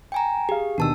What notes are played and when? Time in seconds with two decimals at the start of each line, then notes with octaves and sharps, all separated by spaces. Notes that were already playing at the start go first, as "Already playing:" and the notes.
0.12 G5 G#5 A#5
0.49 G4 G#4 F5
0.78 D#2 B2 D#3 D4 A5 E6